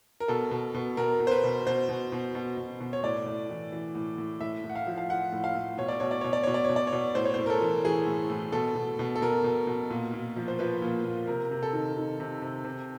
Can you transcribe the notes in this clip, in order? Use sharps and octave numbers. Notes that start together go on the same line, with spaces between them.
A#4
B2 A4
B2
B2
B2 A#4
B2
C5
B4
B2
B2 C5
B2
B2
B2
B2
B2
C#5
A2 D5
A2
E3
E3
A2
A2
A2 E5
A2
F#5
F5
F3
F5
F3 F#5
A2
F5
A2
B2 C#5
D5
B2 C#5
D5
B2 C#5
D5
B2 C#5
D5
B2 C#5
D5
C#5
B2
A2 C5
C#5
A2 C5
A#4
A4
E3
E3 G#4
A2
A2
B2 A4
B2
B2
A4
B2 A#4
B2
B2
A#2
A#2
F3
C5
F3 B4
A#2
A#2
C3 A#4
C3
A4
D#3
D#3
C3
C3
C3